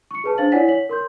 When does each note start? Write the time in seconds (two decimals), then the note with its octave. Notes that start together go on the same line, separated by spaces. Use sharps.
0.11 C#6 C#7
0.24 G#4 B4 A5
0.38 D4 C5 F5 A6 F#7
0.52 E4 C#5 D5 F#5 G#5 B6
0.68 C#5 B6 F#7
0.89 A#4 C6 G6